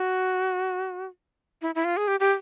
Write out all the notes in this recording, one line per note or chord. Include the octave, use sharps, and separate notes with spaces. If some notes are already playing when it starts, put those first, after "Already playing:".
Already playing: F#4
E4
E4
F4
G#4
G4
G4